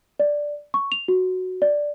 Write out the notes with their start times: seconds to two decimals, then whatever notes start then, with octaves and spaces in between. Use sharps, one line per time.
0.20 D5
0.74 C#6
0.92 F7
1.08 F#4
1.62 D5